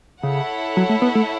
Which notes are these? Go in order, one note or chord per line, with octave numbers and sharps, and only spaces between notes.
C#3 E4 A4 C#5 F#5
F#3
A3
B3
A3